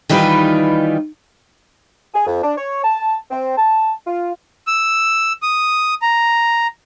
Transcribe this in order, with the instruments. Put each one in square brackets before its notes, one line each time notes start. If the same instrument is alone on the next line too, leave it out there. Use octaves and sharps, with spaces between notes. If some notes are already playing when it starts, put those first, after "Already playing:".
[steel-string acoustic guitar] D#3 E3 G3 D#4 F4 B4
[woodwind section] G#4
F2
D4
C#5
A5
C4
A5
F4
[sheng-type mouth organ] E6
D#6
A#5